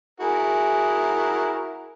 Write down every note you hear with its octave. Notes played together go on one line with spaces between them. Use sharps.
E4 F#4 G#4 A#4